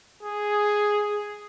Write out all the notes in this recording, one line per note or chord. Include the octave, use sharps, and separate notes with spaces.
G#4